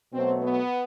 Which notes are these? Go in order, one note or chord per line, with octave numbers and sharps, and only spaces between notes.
B2 F#3 A3 C4
B3